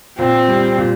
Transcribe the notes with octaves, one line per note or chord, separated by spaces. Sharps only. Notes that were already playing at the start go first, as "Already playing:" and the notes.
A#2 C4
G3
A#2